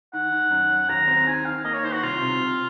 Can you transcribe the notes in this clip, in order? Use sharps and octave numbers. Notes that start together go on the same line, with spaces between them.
D#3 F#5
D#3
F#2
F#2
D#2 A#5
C4
D#3 G#5
D#3 F5
A#3 D#5
C#5
D#3 C5
F#4
C2 F4
C3
C3